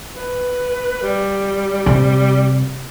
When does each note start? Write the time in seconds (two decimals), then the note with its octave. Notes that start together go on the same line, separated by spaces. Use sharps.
0.15 B4
1.02 G3
1.86 C3